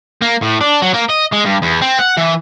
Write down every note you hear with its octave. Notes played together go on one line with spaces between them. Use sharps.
A#3
A2
D4
F#3
A#3
D#5
G#3
G2
E2
C4
F#5
E3